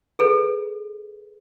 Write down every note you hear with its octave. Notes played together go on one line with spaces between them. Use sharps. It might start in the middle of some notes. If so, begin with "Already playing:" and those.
G#4 A4 B4